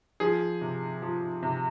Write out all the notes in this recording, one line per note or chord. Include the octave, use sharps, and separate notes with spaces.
F3 G#4
C3
F3
C3